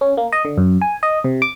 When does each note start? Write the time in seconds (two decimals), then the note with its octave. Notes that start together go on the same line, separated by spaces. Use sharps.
0.01 C#4
0.17 A#3
0.32 D#5
0.45 D3
0.58 F#2
0.81 G#5
1.03 D#5
1.24 C3
1.42 D6